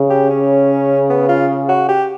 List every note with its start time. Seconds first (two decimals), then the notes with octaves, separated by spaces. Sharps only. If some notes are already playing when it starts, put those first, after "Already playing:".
Already playing: C#3
0.10 G4
0.30 C#4
1.10 B3
1.29 F4
1.69 F#4
1.88 G4